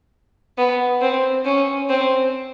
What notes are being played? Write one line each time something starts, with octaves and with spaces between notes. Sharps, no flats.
B3
C4
C#4
C4